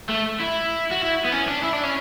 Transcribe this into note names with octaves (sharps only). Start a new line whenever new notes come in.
A3
E4
F#4
E4
B3
C#4
D4
E4
D4
C#4